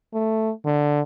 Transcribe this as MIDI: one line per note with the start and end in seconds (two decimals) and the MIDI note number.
0.14 0.50 57
0.65 1.00 50